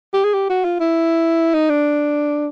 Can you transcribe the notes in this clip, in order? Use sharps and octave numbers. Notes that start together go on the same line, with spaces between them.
G4
G#4
G4
F#4
F4
E4
D#4
D4